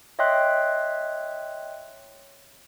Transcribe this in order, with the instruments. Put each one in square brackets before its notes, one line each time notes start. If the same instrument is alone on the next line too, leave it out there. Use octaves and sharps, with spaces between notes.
[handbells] C#5 D#5 E5 G5 C6 F#6